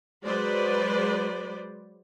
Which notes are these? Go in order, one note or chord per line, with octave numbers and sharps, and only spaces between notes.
F#3 G#3 B4 C5 D5